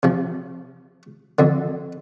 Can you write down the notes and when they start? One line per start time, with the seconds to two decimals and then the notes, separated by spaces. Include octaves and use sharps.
0.03 C3 F3
1.39 F2 D3